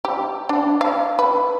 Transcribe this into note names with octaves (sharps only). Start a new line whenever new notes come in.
G4
D4
F5
B4